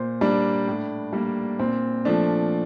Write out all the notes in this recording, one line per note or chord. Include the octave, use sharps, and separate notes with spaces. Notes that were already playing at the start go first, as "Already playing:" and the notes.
Already playing: A#2 C5
G3 A#3 D4
A2
G3 A#3
A#2 C4
F3 A3 D4